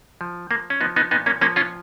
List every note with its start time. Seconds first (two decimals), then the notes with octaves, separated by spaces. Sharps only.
0.21 F3
0.50 F3 A#3
0.70 C#4
0.81 F3 B3 D#4
0.96 B3 D#4
1.11 A#2 B3 D#4
1.26 A#3 C#4
1.41 F3 A#3 C#4
1.56 C#4 F4